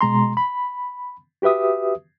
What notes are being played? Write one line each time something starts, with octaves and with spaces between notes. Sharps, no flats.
B2 G#3 A#5 C6
B5
F#4 G4 B4 E5 D#6